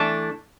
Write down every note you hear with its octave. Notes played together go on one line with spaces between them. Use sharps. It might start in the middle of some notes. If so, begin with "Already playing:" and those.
Already playing: E3 A3 D4